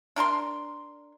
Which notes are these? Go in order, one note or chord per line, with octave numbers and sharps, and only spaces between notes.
D4 A#4 A5 C6